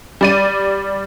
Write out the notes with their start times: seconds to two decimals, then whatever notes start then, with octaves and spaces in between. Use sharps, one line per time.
0.21 G3 D5 D#7